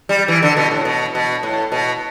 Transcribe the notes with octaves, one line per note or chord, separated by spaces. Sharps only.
G3
E3
D3
B2
A2
B2
B2
A2
B2